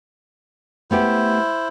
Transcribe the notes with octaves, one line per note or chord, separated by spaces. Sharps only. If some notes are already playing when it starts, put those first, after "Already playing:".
A3 B3 E4 G4 C5